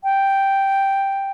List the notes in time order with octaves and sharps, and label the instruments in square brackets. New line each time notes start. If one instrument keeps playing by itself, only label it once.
[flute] G5